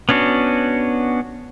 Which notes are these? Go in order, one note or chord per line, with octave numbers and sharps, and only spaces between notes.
B3 C#4 D4 F#4